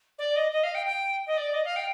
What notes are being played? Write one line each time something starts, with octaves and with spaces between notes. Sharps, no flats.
D5
D#5
D#5
F5
G5
G5
D#5
D5
D#5
F5
G5